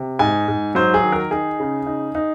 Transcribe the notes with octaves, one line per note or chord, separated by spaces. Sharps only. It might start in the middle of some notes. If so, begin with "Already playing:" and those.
Already playing: C3
G#2 G#5
G#2
F#3 C5
G#4
D#3
A#4
D#4 G#4
C#3
D#4
D#4